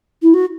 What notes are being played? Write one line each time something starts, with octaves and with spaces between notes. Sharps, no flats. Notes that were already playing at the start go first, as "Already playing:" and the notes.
E4
F#4